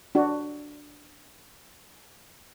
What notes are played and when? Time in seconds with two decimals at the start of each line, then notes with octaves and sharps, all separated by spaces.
0.15 D4 F#4